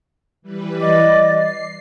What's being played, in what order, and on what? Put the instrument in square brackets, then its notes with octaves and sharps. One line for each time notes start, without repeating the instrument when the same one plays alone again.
[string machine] E3 G3 B4
[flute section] D5 D#5 D6
[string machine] C7